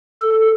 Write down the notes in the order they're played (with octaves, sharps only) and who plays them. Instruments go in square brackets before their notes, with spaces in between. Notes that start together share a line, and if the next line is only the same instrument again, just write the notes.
[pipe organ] A4